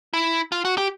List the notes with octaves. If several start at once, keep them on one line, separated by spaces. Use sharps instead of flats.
E4
F4
F#4
G4